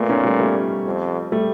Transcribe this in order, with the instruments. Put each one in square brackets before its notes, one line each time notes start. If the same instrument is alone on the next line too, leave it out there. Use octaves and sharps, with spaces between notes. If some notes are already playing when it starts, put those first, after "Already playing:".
Already playing: [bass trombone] A#2 [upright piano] A3 B3
[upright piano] C#4 D#4
G3 A3
G3 A3
[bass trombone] F2
[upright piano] G3 A3